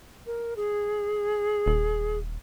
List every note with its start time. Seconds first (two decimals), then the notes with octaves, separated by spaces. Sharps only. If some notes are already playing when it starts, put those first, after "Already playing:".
0.26 A#4
0.56 G#4
1.66 D#1